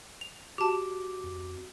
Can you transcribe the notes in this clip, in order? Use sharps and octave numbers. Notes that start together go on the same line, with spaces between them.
F7
F#4 G4 A5 D6
F2